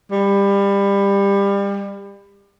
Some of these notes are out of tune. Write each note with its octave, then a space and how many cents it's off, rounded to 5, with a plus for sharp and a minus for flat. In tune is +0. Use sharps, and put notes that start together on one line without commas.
G3 +25